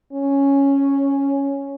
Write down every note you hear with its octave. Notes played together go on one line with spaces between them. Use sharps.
C#4